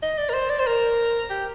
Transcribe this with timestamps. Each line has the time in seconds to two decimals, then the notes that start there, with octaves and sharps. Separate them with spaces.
0.03 D#5
0.18 D5
0.29 A#4
0.33 C5
0.50 D5
0.59 C5
0.67 A#4
1.30 G4